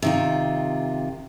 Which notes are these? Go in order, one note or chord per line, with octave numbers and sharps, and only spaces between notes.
C3 D#3 F4